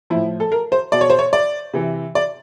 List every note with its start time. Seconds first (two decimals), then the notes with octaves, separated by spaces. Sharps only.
0.10 A2 F3 E4
0.40 A4
0.52 A#4
0.72 C5
0.92 B2 D5
1.01 C#5
1.10 C5
1.19 C#5
1.33 D5
1.74 C3 E3
2.15 D5